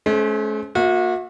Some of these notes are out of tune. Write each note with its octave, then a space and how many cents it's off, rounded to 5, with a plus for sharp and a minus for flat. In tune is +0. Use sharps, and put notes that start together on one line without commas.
A3 -45 C#4 +5 C5 -5
A#3 +0 F#4 -35 E5 +0